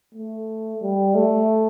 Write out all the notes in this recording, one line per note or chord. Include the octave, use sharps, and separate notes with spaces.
A3
G3
A3